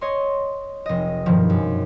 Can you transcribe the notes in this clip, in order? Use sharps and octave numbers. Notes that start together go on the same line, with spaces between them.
C#5 D#5 C6
F1 D#5
G2 B2 D#3 F3
F#2